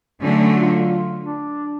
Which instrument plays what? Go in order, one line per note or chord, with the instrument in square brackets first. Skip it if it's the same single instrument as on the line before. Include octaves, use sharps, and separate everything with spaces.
[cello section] D3 F#3 A3 [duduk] C#4
[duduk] C#4
F4
D4